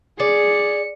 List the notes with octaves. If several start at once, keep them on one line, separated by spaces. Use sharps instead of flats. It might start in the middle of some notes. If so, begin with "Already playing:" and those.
G#4 D5 C#7